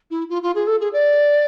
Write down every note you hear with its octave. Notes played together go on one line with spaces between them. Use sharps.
E4
F4
F4
G#4
A4
G#4
D5